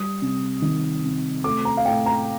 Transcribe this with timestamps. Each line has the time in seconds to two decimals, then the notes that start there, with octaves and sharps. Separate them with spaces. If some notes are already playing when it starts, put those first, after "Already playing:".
Already playing: G3 D#6
0.22 C3
0.62 D#3
1.04 C3
1.44 A3 D6
1.65 A#5
1.77 F5
1.85 A2 G5
2.06 A#5